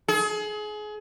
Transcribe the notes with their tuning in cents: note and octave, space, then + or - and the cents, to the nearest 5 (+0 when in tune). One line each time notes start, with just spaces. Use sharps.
G#4 +30